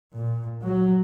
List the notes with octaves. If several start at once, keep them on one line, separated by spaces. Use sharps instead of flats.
A#2
F#3